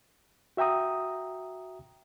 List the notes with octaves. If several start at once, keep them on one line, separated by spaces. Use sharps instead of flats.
F#4 E5 G5 A#5 D#6